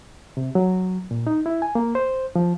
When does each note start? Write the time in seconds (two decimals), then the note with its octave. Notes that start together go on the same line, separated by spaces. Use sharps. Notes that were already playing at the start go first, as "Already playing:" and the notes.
0.37 C3
0.55 F#3
1.11 A#2
1.27 D#4
1.46 E4
1.62 G#5
1.75 A#3
1.95 C5
2.36 F3